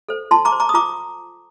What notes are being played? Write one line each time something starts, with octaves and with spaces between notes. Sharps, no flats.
A4 C5
F4 A5 C6
A#5 D6
C5
A#5 D6
D#6
F4 A#5 D6